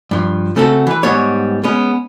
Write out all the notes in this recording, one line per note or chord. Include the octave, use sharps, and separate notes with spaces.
G2 F3
C#3 A3 C4 F#4 A4
E3 B4
G#2 G3 B3 C#5
G#3 B3 C#4